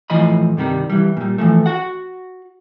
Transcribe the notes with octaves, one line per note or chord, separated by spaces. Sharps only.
A2 E3 F3 D#5 B5
G2 C3 D#3 G3
E3 G3
A#2 G3
E3 F3 A3
F#4 F#5